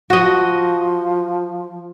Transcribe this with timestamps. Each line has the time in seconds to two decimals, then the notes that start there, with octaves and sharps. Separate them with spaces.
0.10 F3 F#4 D#5